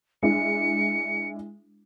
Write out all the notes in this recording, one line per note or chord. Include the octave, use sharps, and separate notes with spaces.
G#3 D4 E4 C#7